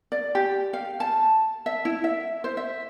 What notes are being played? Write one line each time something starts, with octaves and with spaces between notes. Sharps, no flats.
D5
G4
F5
A5
E5
E4
E5
C5
E5